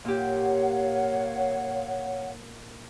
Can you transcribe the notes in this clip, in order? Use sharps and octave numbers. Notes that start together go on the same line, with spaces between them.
A#2 G4 C#5 F5 F#5